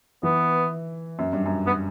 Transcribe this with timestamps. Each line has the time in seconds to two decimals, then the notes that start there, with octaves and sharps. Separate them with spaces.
0.23 E3 B3
1.19 F#2
1.33 G2
1.46 F#2
1.67 B3